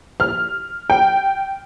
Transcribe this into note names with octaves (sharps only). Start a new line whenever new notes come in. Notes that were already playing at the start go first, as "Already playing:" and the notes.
F6
G5